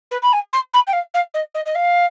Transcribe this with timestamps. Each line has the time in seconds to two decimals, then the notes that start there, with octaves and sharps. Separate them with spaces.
0.11 B4
0.22 B5
0.33 G#5
0.53 C6
0.73 B5
0.87 G5
0.93 F5
1.14 F5
1.34 D#5
1.54 D#5
1.66 D#5
1.75 F5